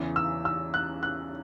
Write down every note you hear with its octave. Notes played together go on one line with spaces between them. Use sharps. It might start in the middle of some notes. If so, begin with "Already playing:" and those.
Already playing: E2 C#3 E3
E6
E6
F#6
F#6